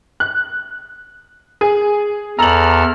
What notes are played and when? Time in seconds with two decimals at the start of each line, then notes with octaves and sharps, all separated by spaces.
0.20 F#6
1.61 G#4
2.39 E2 A4 A#5 F6 F#7